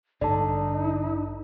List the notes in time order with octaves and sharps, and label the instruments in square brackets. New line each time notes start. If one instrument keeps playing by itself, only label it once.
[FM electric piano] A1 G2 [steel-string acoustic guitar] D3 [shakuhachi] D#4 [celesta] D5 A5